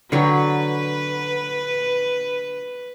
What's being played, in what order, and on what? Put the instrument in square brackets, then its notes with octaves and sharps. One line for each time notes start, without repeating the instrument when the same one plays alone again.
[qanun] D3 F#3 G5 [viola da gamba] B4